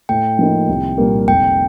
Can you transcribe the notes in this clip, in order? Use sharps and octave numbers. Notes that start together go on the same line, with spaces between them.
A2 G5
F3 A#3 D#4
C2
A#2 G3 A#3
F1 G5